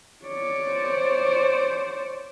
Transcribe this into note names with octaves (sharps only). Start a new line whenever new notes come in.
C#5 D5
C5